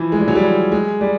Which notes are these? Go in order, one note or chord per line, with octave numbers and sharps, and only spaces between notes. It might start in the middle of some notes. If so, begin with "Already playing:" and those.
Already playing: E3 F3
G#3
G3
F#3
G3
G#3
G3